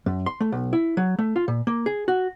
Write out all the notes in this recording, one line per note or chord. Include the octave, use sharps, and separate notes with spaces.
F#2
C6
A3
B1
E4
F#3
A3
F4
A#2
A#3
G#4
F#4